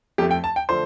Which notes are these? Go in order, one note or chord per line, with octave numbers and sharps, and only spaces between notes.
F2 F3 A3 G4
G5
A5
G5
D3 F3 A3 C5